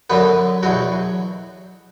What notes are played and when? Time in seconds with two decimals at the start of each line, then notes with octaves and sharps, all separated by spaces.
0.10 F#2 D3 F#3 B3 B4
0.63 E2 B2 F#3 F#4